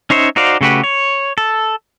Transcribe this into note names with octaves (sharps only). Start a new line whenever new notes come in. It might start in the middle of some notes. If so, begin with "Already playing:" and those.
C#4 D#4 C5 C#5 E5
D#4 F#4 C5 D5 F5
C#3 A3 F#4 G4 B4
C#5
A4